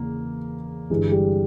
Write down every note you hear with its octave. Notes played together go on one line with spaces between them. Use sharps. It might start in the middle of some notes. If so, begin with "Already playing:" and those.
Already playing: E2 C#3 E3 A#3
G1 G2 E3 G#3
G3